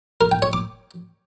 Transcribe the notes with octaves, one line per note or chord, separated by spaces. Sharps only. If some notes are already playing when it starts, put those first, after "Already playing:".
A#4
G5
C#5
D6